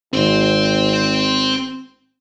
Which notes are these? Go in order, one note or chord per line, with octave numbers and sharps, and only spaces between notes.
G#1 C4 C5